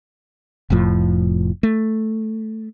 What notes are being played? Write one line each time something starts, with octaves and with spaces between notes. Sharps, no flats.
F1 F2 A2 F3
A3